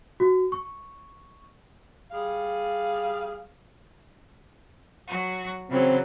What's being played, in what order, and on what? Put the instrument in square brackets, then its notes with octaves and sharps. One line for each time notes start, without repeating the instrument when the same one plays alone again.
[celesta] F#4
C#6
[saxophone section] G3 G#4 F5
[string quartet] F#3 F#4
[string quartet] C#3 E3 F#3 [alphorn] C4